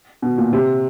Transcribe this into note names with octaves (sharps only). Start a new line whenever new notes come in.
B2
A#2
C3